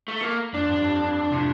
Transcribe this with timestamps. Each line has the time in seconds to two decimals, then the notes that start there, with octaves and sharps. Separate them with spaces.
0.08 A3
0.22 A#3
0.53 F2 D4
0.69 G2
0.84 F2
0.99 G2
1.15 F2
1.30 A2 C3